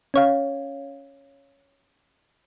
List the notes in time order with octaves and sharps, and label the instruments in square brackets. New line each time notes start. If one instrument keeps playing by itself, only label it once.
[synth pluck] C#4 C#5 F5